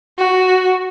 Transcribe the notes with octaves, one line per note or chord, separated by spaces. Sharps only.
F#4